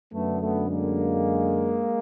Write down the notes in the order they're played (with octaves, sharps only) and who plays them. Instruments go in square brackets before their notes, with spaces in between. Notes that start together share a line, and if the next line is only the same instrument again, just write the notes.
[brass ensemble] F#2 D3 A3 B3
A3 B3
G#3 A#3